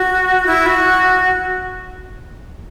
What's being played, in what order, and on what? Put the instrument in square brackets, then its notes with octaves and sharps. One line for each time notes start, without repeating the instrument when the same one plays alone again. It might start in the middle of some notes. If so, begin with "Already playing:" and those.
Already playing: [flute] F#4
E4
F#4